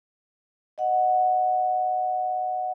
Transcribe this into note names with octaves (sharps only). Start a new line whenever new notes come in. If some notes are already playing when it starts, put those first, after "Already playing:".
D#5 F#5